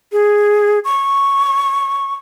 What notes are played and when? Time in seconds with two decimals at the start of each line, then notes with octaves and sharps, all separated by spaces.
0.12 G#4
0.85 C#6